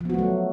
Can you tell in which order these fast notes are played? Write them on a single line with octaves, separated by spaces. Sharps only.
F3 B3 F#4 A3 F#3